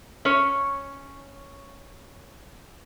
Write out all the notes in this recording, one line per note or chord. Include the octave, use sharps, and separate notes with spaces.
C#4 C#5